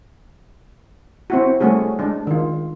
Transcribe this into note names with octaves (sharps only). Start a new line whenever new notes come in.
C4 E4 F#4
G3 A3 C#4 F#4 G#4
G#3 D4
D#3 F4